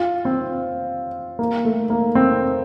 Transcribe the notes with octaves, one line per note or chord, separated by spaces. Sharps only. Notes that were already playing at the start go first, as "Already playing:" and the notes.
Already playing: F4
C4
A#3
A3
A#3
C4